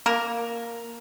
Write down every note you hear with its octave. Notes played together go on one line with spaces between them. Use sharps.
A#3 A#4